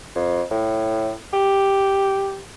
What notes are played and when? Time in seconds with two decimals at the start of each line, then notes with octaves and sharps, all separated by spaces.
0.15 F2
0.51 A2
1.33 G4